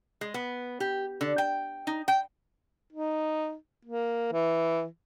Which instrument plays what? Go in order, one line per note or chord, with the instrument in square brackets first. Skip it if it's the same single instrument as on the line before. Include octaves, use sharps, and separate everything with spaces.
[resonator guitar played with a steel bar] G#3
B3
G4
D3
G5
D#4
G5
[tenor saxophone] D#4
A#3
E3